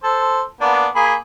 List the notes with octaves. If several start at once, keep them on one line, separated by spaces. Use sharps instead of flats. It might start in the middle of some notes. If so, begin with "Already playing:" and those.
A4 C5
A#3 B3 D4
A#3 G#4 B5